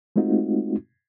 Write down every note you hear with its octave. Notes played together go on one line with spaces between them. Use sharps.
G#3 A3 C4 D#4 F4 F#4